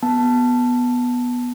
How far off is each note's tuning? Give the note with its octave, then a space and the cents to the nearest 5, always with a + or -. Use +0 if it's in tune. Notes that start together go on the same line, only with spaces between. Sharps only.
B3 -10 A5 +0